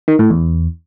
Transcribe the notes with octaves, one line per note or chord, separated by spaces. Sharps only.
D#3
A2
E2